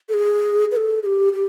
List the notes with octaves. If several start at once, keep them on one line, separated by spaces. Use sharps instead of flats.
A4
G#4
B4
A4
G#4
G4
G4